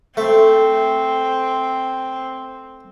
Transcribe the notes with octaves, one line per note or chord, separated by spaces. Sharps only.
A3 C4